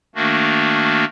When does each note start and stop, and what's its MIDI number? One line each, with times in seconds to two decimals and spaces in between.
0.15 1.05 51
0.15 1.05 57
0.15 1.05 58
0.15 1.05 62
0.15 1.05 66